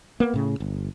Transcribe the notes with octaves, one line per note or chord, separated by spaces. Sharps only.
A#3 B3
A2 C#3
G1